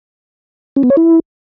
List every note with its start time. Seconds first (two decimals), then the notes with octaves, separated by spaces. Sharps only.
0.76 C#4
0.83 B3
0.90 C#5
0.97 E4